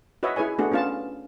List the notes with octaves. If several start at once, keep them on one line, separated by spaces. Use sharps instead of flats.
F#4 B4 C#5 D#5 E5
E4 G#4 B4 C#5 G#5
A3 B3 D4 F#4 G#4
B3 C#4 F4 F5 A5